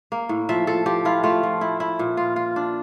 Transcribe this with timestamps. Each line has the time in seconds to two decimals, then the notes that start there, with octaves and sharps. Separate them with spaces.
0.12 A#3
0.29 A2
0.49 F3 E5
0.67 F3 A4
0.86 F3 G4
1.05 E4 F4
1.23 A3 F4
1.43 F3
1.61 E4
1.80 E4
1.99 A#2
2.17 F4
2.36 F4
2.56 D4